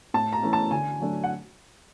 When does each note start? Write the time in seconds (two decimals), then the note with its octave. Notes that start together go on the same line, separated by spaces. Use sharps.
0.14 A2 A5
0.33 A#5
0.42 E3 A3 C#4
0.53 A5
0.71 D3 G#5
1.00 F#3 A3 D4
1.23 F#5